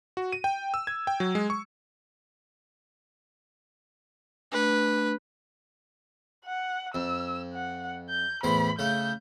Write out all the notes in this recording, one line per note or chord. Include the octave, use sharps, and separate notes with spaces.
F#4
D#7
G5
E6
G#6
G5
F#3
G#3
C#6
A3 D4 B4
F#5
F2 E6
F#5
G6
E2 A2 C5 B5
C#3 A3 G6